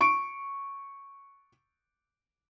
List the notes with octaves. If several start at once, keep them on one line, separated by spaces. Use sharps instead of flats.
C#6 D7